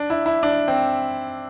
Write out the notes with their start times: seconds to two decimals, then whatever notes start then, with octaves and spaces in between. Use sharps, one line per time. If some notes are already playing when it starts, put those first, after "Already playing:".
Already playing: D4
0.10 E4
0.26 E4
0.43 D4
0.68 C4